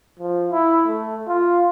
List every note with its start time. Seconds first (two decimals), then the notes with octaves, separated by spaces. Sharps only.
0.19 F3
0.51 E4
0.88 A3
1.28 F4